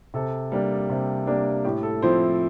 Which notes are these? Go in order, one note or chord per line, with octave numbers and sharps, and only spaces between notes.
C3 A4
G3 A#3 D4
C3
G3 A#3 D4
A2 G4
A4
F3 C4 E4 C5